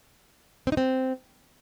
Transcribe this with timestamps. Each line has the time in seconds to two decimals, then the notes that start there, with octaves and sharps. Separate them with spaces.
0.67 C4
0.72 D#4
0.77 C4